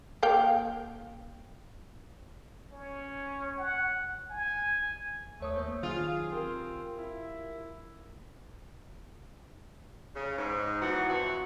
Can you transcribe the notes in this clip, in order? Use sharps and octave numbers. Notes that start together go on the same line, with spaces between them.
A#3 F5 G5
C#4
F#5
G#5
D#2 A3 C#5 D#6
A#3 C5 G6
D#3 F#3 F4 G#4 F6
C4 G4 A#4
E4
C#3
G#2
E3 F#3 B3 F#4
F2 E3 F#4